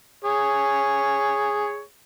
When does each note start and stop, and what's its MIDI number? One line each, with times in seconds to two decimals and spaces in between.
0.24 1.81 68
0.24 1.81 73